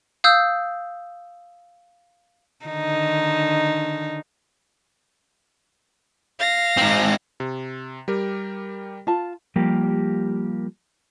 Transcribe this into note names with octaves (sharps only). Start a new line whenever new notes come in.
F5 D#6 E6 G6
D3 D#3 D#4
F5 A#6
G#2 C4
C3
G3 G4 A#4
F4 A5
F3 G3 A#3 G4 A#4